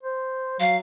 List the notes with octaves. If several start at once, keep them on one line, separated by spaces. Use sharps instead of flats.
C5
F#3 F5